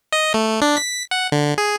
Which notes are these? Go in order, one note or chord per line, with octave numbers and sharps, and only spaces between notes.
D#5
A3
D4
B6
F#5
D3
G#4